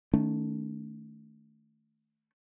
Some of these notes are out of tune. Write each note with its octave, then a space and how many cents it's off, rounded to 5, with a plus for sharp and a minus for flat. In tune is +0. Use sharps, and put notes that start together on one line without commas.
D#3 +0 A3 +0 C#4 +35